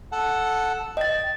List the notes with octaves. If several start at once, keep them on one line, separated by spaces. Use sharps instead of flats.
A4 F#5 A5
D#5 G5 A6